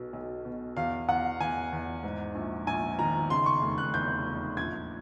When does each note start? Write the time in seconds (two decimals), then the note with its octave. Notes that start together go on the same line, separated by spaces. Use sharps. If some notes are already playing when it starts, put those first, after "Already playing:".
Already playing: B1 B2
0.13 B1
0.45 B2
0.77 E2 F5
1.08 E2 F#5
1.41 E2 G#5
1.72 E2
2.03 G#2
2.35 A#1
2.67 A#1 G#5
2.99 D#3 A#5
3.30 C#3 C6
3.46 C#6
3.62 F1
3.78 F#6
3.94 E2 G6
4.26 E2
4.57 A#1 G#6